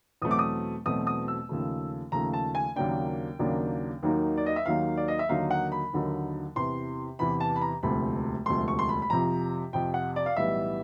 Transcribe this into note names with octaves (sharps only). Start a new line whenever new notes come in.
E2 B2 F#3 A3 C4 D#6
D6
D#6
E2 B2 F#3 A3 C4 D#6
D#6
E6
D#2 C#3 F3 A3
D#2 C#3 F3 A3 A#5
A5
G#5
D#2 C#3 F#3 A#3 D4 G5
D#2 C#3 F#3 A#3 D4
D#2 D#3 F#3 A#3 D#4
D5
D#5
E5
D#2 D#3 F#3 A#3 D#4 F5
D5
D#5
E5
D#2 D3 F#3 A#3 D#4 F5
F#5
B5
D#2 D3 F#3 A#3 D#4
E2 C3 E3 C6
E2 C3 E3 B5
A5
B5
A#5
E1 D2 C3 F3 A3 B5
E1 D2 C3 F3 A3 C6
C#6
C6
B5
B5
F2 C3 F3 A#5
F2 C3 F3 G5
F#5
D5
F5
B1 A2 E3 G3 B3 E5